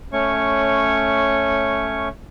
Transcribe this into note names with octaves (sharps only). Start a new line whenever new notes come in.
A3 C#4 C#5 C#6